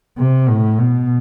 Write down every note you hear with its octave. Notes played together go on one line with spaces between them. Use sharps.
C3
A2
B2